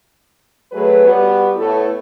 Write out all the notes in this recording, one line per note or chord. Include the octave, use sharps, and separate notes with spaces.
F#3 A3 G#4 B4
G3 B3 F#4
A2 A3 B3 E4 A4